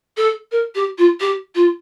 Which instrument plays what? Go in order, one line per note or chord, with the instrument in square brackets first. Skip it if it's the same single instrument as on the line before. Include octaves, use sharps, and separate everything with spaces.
[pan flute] A4
A#4
G4
F4
G4
F4